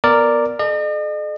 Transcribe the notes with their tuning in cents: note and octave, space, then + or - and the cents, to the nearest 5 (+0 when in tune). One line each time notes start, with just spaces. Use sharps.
B3 +0 A#4 -5 D5 +0
A4 -45 D#5 -45